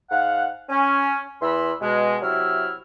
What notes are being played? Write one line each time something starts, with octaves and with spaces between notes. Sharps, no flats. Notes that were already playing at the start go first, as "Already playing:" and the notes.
G#2 F5 F#5
C#4
E2 E3 B5 C6 E6
B2 G#3
C3 F#3 E4 E6 F6